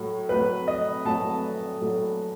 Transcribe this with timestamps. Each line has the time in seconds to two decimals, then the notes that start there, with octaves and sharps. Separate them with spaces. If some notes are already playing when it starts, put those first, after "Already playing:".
Already playing: A2 F#3 A3
0.29 A2 F#3 A3 B4
0.68 D#5
1.05 A2 F#3 A3 A5
1.81 A2 F#3 A3